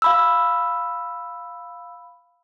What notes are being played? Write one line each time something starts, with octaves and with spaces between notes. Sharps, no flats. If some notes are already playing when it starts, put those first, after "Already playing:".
F5 B5 E6